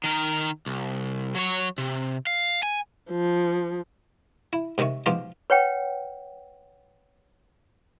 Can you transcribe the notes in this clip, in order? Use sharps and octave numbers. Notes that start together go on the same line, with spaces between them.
D#3 A#4
C2
F#3 C#5
C3
F5
G#5
F3
E4
G#2 C3 D#3 E5 C#6
G#2 B2 F3 C4 F4 G4
B4 C#5 F#5 G5